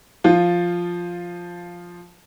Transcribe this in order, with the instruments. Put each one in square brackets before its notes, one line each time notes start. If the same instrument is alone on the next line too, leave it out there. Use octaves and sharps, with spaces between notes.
[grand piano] F3 F4